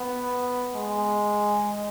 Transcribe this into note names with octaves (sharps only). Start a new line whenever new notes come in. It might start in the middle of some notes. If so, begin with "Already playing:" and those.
Already playing: B3
G#3